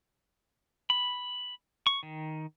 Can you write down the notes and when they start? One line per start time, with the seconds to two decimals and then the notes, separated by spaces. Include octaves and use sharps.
0.90 B5
1.87 C#6
2.03 D#3